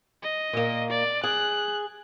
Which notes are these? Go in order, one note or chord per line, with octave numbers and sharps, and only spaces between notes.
D#5
A#2 A#3
D5
G#4 F#6